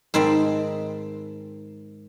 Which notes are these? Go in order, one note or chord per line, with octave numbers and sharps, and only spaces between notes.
G#2 D#3 C4 A5 B5